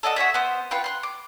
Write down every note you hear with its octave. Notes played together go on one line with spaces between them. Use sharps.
A4 D5 D#5 F#5
F#4 G#4 C#5 E5
B3 C5
F4 B4 F#5 G5
C6 F#6
D6